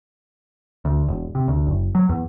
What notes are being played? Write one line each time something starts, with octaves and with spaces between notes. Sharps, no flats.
D2
E1
C3
D2
F#1
F#3
E2